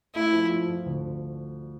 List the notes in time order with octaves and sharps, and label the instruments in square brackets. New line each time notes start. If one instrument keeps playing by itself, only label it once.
[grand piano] A3 [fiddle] E4
[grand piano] F3
F3
F3
D2